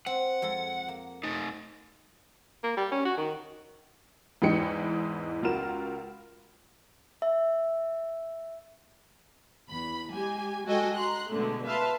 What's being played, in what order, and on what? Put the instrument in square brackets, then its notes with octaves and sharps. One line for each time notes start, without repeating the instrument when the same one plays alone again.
[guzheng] C4 [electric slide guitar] F#5
[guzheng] F2 G#3 A4
A#3
[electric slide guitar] A3 D#4
[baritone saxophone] A#3
G3
C#4
F#4
D#3
[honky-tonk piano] E2 G#2 E3 G#3 G5 C#7
C#2 F4 F#4 A#4 E7
[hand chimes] E5
[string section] E2 B5
G#3 G4 G#5
G#3 F#4 A4 D#5 G5 G#5
A#5 C6 F#6
B2 D3 G#3 A3
B4 E5 F5 A5 C6